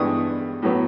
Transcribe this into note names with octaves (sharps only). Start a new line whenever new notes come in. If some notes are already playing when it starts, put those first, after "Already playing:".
Already playing: G2 E3 G#3 B3 D4 C#6 D#6
A2 F#3 B3